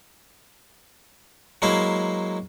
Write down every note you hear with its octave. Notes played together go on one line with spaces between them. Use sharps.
F#3 G#3 A#3 E4 C5